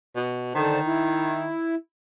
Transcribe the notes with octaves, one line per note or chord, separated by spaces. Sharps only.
B2
D3 D#3 C5 A5
E4